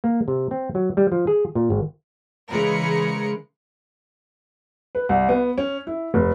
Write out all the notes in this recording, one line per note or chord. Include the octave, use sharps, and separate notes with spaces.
A#3
C3
C4
F#3
G3
F3
G#4
A#2
G#1
C#3 E3 G#3 A#4 B5 C#7
B4
C2
B3
C#4
E4
F1